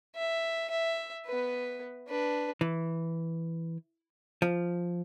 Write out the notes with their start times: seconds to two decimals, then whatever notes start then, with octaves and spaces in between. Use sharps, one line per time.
0.16 E5
0.70 E5
1.26 B3 B4
2.08 D4 B4
2.61 E3
4.42 F3